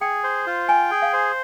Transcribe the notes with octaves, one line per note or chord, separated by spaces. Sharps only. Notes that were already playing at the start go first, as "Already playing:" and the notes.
G#4 G5
C5
F4
G5 G#5
G#4
F5
C5